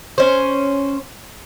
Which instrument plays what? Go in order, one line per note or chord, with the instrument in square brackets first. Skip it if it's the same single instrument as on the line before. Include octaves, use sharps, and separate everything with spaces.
[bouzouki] C#4 C5